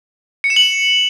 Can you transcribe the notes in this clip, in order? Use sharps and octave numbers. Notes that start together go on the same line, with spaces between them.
C#7
E7
F#7